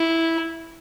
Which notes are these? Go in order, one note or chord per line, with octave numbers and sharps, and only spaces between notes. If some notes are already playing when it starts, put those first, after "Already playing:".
Already playing: E4